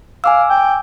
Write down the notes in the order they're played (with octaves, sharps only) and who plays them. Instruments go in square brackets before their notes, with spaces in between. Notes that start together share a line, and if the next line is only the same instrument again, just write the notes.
[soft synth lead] F5 [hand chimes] G#5 D6 E6
[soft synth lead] G5